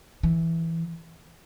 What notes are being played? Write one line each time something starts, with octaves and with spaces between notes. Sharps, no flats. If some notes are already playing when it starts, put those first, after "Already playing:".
E3